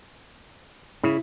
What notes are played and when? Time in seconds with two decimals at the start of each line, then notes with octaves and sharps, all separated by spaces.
1.03 C#3 E4